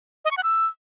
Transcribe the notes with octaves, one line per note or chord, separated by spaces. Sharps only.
D#5
C#6
F#5
E6